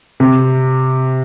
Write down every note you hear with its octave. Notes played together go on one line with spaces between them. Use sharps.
C3